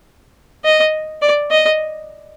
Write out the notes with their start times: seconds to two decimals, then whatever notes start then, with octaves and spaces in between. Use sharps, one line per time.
0.65 D#5
1.22 D5
1.50 D#5